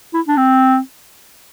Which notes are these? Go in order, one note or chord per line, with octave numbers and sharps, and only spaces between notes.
E4
D4
C4